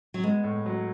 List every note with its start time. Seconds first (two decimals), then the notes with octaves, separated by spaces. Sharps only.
0.14 F#3
0.23 G#3 B3
0.44 A2
0.66 F#3